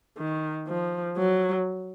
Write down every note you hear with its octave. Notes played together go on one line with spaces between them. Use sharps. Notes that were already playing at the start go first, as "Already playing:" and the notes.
D#3
F3
F#3